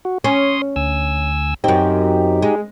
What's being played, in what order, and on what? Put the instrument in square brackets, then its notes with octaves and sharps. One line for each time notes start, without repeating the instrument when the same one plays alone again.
[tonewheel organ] F#4
[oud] C#4 [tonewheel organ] C#5 C6 D#6
[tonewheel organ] D2 G#5 E6
[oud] F#2 C4 [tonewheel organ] D#4 G4
[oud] G#3